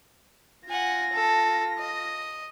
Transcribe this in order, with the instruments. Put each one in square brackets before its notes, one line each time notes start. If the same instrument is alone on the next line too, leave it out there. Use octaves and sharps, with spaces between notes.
[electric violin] F4 A#6 [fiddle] F#5 G#5
[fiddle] A4
D#5